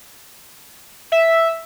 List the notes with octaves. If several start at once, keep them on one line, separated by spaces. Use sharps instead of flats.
E5